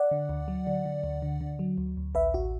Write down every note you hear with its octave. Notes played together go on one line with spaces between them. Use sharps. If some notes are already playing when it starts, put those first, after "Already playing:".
Already playing: D5 F#5
D3
D2
F#3
D3
D3
D2
D3
D3
F#3
D2
D2
A1 B4 E5
A1 F#4